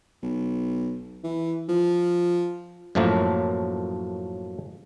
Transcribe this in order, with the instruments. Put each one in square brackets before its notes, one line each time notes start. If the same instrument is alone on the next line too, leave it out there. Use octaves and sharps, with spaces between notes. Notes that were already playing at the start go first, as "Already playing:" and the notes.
[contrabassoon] B1
E3
F3
[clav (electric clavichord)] F#2 A2 F3 F#3 A3 A#3